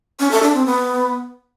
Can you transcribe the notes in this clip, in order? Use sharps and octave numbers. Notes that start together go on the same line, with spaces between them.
C#4
A4
D4
C4
B3